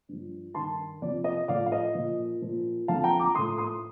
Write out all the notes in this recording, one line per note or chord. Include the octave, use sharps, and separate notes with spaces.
G2 F3
G2 D#3 A5 C6
F2 C3 F3 D5
D#5
A2 F3 D5 F5
F5
D#5
A#2 F3
A#2 F3
F2 D3 F3 F5 A5
G5 A#5
A#5 D6
A2 F3 C6 D#6
C6 D#6